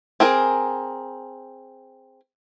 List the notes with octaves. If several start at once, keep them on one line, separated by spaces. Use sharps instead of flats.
C4 G#4 A#4